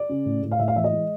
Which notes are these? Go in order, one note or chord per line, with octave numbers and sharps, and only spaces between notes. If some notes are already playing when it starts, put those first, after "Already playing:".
Already playing: D5
C#3
A2
A2
F5
A2 E5
F5
E3 E5
D#5
G#3